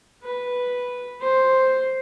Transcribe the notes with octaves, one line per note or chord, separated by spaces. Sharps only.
B4
C5